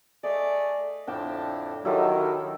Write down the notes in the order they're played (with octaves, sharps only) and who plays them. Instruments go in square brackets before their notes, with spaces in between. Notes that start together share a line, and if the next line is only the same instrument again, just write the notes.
[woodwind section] A3 G#4 D5 [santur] D#5
[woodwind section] F2 A2 D3 [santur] D4 G5 A5
[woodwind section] D#3 [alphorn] F#3 [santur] E4 G4 A4